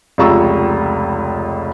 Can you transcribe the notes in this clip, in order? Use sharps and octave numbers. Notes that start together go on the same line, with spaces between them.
F1 C#2 F4 A#5 C#6 E6